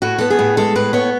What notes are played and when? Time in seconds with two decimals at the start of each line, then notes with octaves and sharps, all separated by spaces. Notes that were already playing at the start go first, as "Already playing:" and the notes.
0.02 A2 F#4
0.18 B3 A4
0.30 G#4
0.39 A2
0.57 G#3 A4
0.76 A2 B4
0.93 B3 C#5